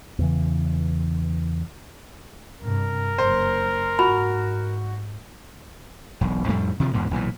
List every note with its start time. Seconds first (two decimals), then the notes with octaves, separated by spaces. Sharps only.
0.19 E2 C#3 E3
2.61 G2 C3 A#4
3.18 F#1 C5
3.99 G#2 F#4 B5
6.21 E1 B1
6.48 F2 A2 G3 A3
6.80 C3 D#3 F3
6.93 E2 G#2 B2
7.11 B1 A#2 D#3 E3